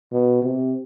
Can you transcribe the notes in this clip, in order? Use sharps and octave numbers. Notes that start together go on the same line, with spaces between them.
B2
C3